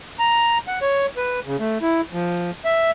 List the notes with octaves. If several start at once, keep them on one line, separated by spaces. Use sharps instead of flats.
A#5
F#5
C#5
B4
C#3
A3
E4
F3
E5